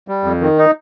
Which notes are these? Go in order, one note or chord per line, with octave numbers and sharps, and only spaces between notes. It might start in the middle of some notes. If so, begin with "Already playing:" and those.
G3
F2
D#3
D#4